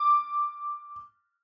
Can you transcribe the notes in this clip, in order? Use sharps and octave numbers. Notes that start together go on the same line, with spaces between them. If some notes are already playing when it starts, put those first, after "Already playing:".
Already playing: D6